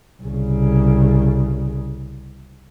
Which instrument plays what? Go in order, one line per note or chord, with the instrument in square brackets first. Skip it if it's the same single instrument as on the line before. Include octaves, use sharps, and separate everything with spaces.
[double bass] C2 C#3